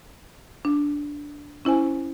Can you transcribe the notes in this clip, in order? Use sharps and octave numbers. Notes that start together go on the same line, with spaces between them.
D4
C#4 E4 C5 G#5